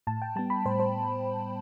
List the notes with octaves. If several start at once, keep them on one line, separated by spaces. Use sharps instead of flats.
A2 A5
G5
G3 B3 A5
B5
A2 C5
C5